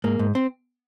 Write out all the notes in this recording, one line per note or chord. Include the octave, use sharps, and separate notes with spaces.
G#2 A#3
G#2
C4